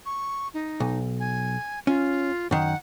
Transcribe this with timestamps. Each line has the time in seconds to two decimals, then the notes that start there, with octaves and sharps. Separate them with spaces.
0.06 C#6
0.54 D#4
0.80 B1
1.20 G#5
1.87 C#4 F4
2.51 F#2 D#3 F#5